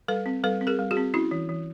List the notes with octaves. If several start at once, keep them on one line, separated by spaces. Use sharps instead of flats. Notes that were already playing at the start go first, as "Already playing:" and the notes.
G3 A4 B4
C4
G3 A4 B4
C4
G#4 A#4
G3
F#4 G#4
C4
C#4 E4 F#4
E3
E3